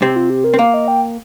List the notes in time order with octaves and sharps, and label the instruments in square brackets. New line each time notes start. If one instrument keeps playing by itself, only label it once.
[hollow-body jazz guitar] C3 C4 [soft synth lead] G4
[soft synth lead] F4
G4
A#4
[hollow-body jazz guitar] C4
[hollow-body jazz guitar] A#3 [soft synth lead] F5
[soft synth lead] D#5
G5